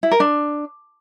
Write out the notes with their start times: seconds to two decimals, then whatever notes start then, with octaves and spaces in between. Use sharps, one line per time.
0.03 E4
0.11 A#4
0.20 D4